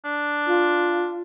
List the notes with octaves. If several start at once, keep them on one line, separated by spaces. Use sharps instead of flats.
D4
F4